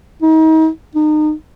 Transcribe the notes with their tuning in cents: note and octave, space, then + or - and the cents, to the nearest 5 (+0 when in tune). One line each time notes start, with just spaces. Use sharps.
D#4 +35
D#4 -30